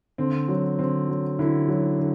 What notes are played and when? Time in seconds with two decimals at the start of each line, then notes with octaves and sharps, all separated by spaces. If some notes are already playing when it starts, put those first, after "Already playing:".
0.18 D3 C4
0.48 F#3
0.79 D3 C4
1.08 F#3
1.39 D3 E4
1.68 F#3
1.99 D3